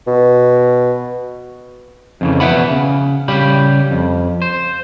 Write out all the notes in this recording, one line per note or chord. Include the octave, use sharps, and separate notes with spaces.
B2
F2 C#3 E3
E2 B2 B4 E5 F#5 B5
C#3
C#3 G3 G4 B5
F2
C5